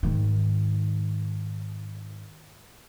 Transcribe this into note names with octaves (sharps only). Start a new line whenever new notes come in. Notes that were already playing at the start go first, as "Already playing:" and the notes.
G#2 D#3